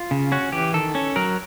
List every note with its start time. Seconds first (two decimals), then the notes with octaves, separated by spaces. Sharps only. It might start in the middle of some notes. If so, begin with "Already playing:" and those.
Already playing: F4
0.11 C#3
0.32 C#4 F#4
0.52 E3 G4
0.74 D#3 A4
0.95 C#4
1.16 F#3 A#4